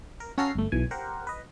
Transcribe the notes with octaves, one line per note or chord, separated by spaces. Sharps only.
A#4
C#4 F#4 A4 F5 A#5 C7
G1 A3
B1 E3 G#5
G4 A#4 C5 F#5
B4 D#5